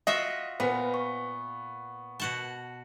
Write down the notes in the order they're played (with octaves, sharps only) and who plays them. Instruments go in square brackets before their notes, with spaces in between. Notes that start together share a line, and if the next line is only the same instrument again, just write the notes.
[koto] F4 F#4 E5 [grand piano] D#5
[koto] A#2 [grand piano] B3 [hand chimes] B4 C5
[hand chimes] C#6
[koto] B2 F#4 A5